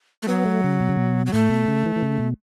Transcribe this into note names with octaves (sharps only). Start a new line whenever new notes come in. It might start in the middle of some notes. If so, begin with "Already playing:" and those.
A3
F#3 B3
A3
C#3
B2
C#3
B2
F#3
A2 A3
B2
C#3
E3
E3
C#3
B2